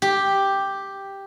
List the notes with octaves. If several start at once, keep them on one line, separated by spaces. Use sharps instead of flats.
G4